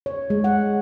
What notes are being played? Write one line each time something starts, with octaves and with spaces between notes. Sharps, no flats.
C#5
G#3
F#5